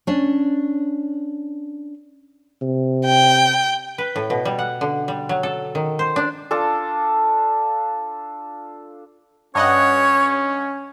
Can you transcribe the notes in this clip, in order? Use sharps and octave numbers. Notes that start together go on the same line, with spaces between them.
C#4 D4
C3
G5
B4
A2
B2
G3
F#5
D3
G3
F#3
A4
D#3
C5
D4
D4 F4 A4
G2 C#4 C#5 D#5 F#5